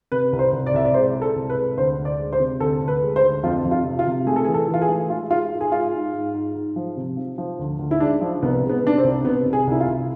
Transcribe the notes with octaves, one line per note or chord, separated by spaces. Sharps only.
C3 B4
C2
C5
C2
D5
C2 E5
D5
G#3 C5
G#3
A4
C2
B4
G#3
D2 C5
D2
D5
G#3
C5
C3
D2 A4
D2
B4
G#3
C5
D2
F2 F4
F2
F4
C3
F4
C3
A3 G#4
A4
E3 G#4
A4
E3
F4
G#4
A3
G#3 F4
G#3 F4
G#2
G#4
G#3 F4
G#2
G#2
G#2
G#2
F3
C3
F3
F3
D2
D2
E4
G#3 D4
F3
C2 B3
G#3
B3
C3 D4
C4
C2
C3 B3
C2
G#4
C2 E4
F4
C2